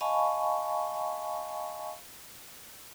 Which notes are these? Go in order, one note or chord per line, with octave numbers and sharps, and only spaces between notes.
D#5 F5 G#5 A5 B5 C#6